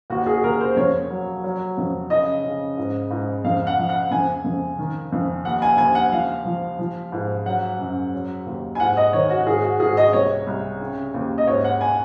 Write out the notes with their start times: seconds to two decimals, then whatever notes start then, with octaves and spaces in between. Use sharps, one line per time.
0.10 D#2 F#4
0.27 G#4
0.44 D#2 A#4
0.61 C5
0.76 F2 C#5
1.10 F#3
1.44 F#3
1.77 F2
2.10 C#3 D#5
2.44 C#3
2.77 G#2
3.11 G#2
3.44 F2 F5
3.67 F#5
3.78 F3
3.89 F#5
4.11 F2 G#5
4.44 F2
4.78 D#3
5.12 F2
5.45 D#2 F#5
5.62 G#5
5.78 D#2 G#5
5.95 F#5
6.12 F3 F5
6.45 F3
6.79 F3
7.12 G#2
7.46 F#3 F#5
7.79 F#2
8.13 F#3
8.46 D#2
8.75 G#5
8.80 G#2 F#5
8.97 D#5
9.13 D#3 C#5
9.30 F#4
9.46 G#2 G#4
9.64 F#4
9.80 G#2 G#4
9.97 D#5
10.13 C2 C#5
10.47 C2
10.80 C#3
11.14 D#2
11.38 D#5
11.47 G#2 C#5
11.64 F#5
11.81 G#5